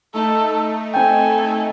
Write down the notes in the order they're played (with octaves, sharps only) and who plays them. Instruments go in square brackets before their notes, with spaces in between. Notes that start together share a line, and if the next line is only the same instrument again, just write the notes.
[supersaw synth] A3 D#4 [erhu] A4
[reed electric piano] C4 G5 [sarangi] A4 [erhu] G#5